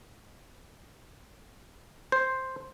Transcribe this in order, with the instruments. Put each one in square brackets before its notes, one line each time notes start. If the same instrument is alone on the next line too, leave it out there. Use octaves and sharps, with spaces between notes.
[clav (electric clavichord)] C5